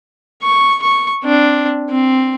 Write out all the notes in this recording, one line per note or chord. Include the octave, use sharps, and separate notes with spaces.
C#6
C#6
C4 D4
C4